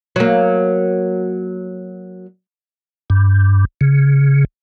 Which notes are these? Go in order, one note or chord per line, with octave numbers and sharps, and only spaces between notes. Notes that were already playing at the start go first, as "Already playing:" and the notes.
F#3 A#3
G2
C#3